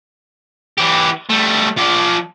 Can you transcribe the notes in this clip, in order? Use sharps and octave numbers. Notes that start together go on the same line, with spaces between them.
E3 G4
G3 A3
F3 D5